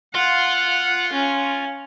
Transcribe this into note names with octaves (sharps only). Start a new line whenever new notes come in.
F4 F#5
C#4